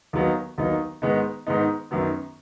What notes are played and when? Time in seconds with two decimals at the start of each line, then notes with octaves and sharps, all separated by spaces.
0.13 D#2 D#3 F#3 B3 D#4
0.58 D#2 D#3 F#3 B3 D#4
1.02 G#2 D#3 G#3 B3 D#4
1.46 G#2 D#3 G#3 B3 D#4
1.91 F#2 D#3 F#3 B3